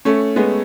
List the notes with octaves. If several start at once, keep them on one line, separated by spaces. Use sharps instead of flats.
A3 C#4
G#3 B3